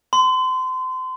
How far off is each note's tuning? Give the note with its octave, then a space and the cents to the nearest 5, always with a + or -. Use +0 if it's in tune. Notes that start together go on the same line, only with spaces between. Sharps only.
C6 -30